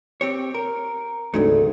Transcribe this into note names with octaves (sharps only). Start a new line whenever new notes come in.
C4 G4 C#5
A#4
G#1 D2 C#3 G#3 A3